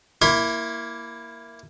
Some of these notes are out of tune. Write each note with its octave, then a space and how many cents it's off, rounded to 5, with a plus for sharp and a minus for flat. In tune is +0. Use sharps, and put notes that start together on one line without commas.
A#3 +0 E4 +10 C6 +40